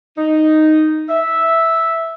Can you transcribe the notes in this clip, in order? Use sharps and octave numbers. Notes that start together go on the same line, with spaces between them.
D#4
E5